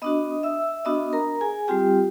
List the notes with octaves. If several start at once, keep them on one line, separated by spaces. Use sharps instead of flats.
B3 D4 F#4 D#5 D#6
E5 E6
B3 D4 F#4 D#5 D#6
A#4 A#5
G#4 G#5
G3 C4 F4 G4 G5